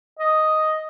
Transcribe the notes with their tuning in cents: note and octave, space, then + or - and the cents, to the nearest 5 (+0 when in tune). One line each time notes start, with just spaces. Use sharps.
D#5 +0